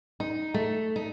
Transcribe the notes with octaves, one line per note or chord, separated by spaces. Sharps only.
D#4
A3
D#4